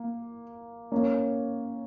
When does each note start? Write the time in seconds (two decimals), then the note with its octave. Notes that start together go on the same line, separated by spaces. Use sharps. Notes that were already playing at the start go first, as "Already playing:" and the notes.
Already playing: A#3
0.92 A#3 C#4